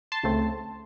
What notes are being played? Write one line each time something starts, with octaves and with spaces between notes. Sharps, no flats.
A5 C6
C#2 C#3 A3 C4